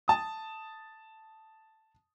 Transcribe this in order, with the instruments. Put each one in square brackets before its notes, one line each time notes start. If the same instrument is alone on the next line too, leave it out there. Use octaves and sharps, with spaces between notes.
[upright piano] A5 D#6